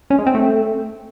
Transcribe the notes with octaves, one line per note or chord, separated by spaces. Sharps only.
C#4
G#3
C4
A3